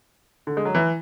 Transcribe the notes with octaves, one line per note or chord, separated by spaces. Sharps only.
D3
G#3
F#3
E3